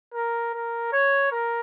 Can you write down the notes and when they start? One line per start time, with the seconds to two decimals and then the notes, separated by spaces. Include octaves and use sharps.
0.14 A#4
0.54 A#4
0.92 C#5
1.32 A#4